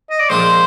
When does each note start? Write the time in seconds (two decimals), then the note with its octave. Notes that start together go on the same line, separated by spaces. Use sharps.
0.10 D#5
0.20 D5
0.29 A#1 A#2 G#3 D4 C5